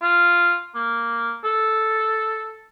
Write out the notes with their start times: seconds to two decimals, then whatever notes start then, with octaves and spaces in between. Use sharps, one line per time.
0.02 F4
0.75 A#3
1.45 A4